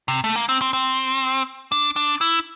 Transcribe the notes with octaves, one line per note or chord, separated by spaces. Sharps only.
C3
A3
A#3
C4
C4
C4
D4
D4
E4